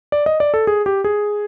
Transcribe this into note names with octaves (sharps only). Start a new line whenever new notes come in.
D5
D#5
D5
A4
G#4
G4
G#4